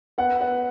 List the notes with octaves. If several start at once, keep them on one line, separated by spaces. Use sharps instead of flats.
B3 F#5
B3